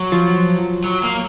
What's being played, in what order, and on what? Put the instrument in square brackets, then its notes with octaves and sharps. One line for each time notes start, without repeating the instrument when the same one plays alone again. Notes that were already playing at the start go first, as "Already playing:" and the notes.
Already playing: [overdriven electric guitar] F#3
[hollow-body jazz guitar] F3
[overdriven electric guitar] F#3
A#3